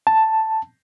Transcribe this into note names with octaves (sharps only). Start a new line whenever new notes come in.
A5